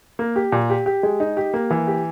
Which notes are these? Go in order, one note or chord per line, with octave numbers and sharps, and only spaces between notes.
A#3
G4
A#2
G4
G4
G#3
D#4
G4
A#3
E3
G4